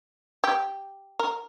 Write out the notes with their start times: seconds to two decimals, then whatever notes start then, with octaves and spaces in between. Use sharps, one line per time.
0.44 G4
1.19 A#4